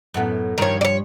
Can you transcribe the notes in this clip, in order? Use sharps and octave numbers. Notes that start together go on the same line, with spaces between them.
F#2 A2 B3
G2 D#3 F3 C#5
C#5 D5